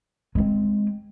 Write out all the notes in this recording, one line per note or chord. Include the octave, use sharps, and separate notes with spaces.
G#3 C4